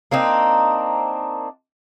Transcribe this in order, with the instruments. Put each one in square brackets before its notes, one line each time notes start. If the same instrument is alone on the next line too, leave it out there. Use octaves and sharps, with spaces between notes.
[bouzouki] A#3 C4 D4 D#4